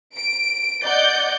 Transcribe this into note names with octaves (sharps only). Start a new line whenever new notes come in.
D7
D5 D#5 F#5 G6